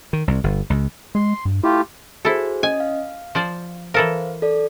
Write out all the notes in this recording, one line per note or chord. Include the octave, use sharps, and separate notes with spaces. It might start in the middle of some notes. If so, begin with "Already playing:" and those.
D#3
C2
G1
C#2
G#3 C6
G2
A3 E4 F4 G4
E4 F#4 G#4 A4 C5
C#4 D#5 G#5
F5
F3 C5 D5
E3 A4 A#4 C5 F5
A4 D5